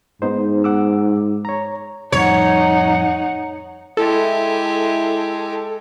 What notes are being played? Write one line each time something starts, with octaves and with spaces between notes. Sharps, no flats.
G#2 B3 D#4 C5
F#5 D6 E6
C#5 A#5
F2 A2 G3 D#4 C#5 F#5
G#3 E4 G4 A4